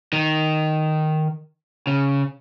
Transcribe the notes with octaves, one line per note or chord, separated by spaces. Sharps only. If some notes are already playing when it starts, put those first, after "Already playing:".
D#3
C#3